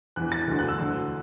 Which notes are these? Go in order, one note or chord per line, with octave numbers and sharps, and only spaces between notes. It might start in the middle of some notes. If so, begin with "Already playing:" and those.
E2 E3 F#6
A6
D2 D3
F#6
E6
D2 D3